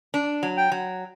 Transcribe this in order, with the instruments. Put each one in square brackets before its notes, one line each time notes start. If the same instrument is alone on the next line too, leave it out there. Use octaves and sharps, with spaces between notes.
[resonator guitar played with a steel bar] D4
F#3
[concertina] G5
[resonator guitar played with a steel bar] F#3